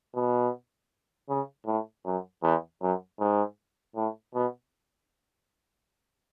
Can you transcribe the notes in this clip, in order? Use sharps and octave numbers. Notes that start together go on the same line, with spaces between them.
B2
C#3
A2
F#2
E2
F#2
G#2
A2
B2